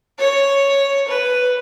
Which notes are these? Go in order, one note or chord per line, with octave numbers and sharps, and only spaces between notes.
C#5
B4